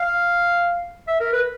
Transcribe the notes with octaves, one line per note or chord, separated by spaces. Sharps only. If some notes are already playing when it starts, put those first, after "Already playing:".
Already playing: F5
E5
A#4
B4